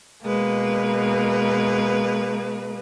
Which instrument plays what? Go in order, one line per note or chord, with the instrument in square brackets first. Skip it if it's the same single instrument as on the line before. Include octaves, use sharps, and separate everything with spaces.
[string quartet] B2 G#3 A#3 B4